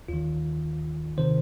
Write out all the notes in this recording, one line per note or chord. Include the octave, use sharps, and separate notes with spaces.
D#2 D#3 F4
C3 D#3 C5